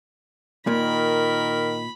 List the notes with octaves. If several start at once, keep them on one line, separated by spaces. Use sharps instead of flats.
A#2 D#3 A#4 B5